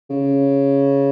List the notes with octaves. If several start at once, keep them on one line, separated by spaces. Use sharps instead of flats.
C#3